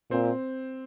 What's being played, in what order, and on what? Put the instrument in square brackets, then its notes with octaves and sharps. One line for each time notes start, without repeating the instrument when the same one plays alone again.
[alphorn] A#2 [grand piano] C4